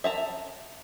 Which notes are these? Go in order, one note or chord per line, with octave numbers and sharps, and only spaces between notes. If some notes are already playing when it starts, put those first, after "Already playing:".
E5 A5 A#5